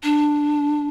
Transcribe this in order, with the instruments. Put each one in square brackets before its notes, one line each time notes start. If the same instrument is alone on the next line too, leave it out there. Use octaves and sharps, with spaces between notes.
[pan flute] D4